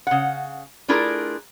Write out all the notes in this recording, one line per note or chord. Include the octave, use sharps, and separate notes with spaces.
C#3 F#5
A3 D4 E4 F4 G#4 A#4